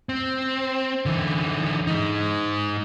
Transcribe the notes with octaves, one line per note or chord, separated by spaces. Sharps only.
C4
D3 E3
G#3 D#4